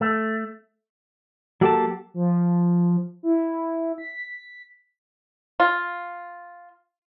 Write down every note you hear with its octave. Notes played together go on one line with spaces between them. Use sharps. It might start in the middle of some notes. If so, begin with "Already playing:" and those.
A3
F#3 A#3 G4 A4 F#5 A5
F3
E4
B6
F4